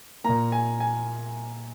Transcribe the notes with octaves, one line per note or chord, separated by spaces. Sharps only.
A#2 A#3 A#5
G#5
G#5